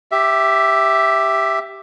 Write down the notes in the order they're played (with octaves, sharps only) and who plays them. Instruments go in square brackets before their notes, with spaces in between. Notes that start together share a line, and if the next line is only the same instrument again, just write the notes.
[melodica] G4 E5